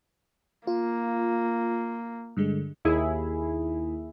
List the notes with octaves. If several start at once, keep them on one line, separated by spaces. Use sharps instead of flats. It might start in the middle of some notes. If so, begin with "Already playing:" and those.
A#3 F4
G2 D3 G#3
D#2 E4 G#4